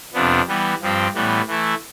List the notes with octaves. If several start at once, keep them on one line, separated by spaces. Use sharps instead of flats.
F2 C3 F3 B3 D4
E3 G3 B3
G2 F3 C4 G4
A2 E3 G3 B3
E3 A3 E4